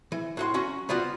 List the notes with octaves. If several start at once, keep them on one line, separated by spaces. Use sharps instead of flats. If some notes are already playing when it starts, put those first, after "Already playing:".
E3
A2 F#4 C6
F#3 C#4 F#4
G3 B3 F4 F#4